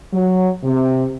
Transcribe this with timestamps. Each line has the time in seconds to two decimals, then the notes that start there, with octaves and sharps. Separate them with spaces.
0.12 F#3
0.63 C3